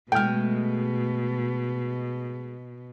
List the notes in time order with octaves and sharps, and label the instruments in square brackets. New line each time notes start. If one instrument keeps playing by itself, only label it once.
[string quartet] B2 [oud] G#3 A3 [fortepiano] G5 F6